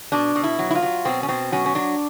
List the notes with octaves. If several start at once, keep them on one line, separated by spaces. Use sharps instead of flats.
B2 D4
B2
E4
F#3
E4
F4
F#3
B2 C4
C#4
B2 C4
F#3 C#4
C#4
F#3 D4